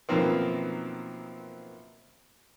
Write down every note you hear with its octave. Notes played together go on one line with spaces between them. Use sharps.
F#2 B2 D#3 F3 A#3 C4